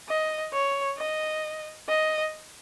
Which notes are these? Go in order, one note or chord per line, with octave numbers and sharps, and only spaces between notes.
D#5
C#5
D#5
D#5